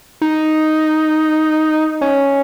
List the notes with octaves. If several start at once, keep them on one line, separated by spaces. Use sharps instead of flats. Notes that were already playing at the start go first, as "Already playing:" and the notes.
D#4
C#4